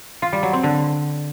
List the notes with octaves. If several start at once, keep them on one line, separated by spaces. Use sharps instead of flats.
F4
G3
F#3
C4
D3